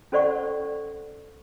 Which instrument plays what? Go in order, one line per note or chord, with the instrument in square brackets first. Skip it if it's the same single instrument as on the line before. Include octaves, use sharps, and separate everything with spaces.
[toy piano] C#4 A4 C5 D5 F#5 C#6